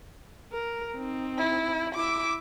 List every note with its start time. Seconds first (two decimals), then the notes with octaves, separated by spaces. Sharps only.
0.52 A#4
0.95 C4 D#4
1.38 E4
1.95 E4 E5 D6